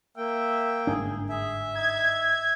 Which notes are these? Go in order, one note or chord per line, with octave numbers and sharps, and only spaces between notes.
A#3 E5 G5
G1 G#2 D4 G#4
G#4 E5
D#4 G#6